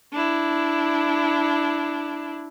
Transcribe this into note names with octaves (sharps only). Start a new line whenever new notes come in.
D4 E4